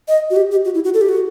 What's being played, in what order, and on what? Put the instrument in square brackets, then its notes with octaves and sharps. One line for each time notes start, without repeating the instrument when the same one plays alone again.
[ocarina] D#5
F#4
G4
G4
F#4
E4
F#4
A4
G4
F#4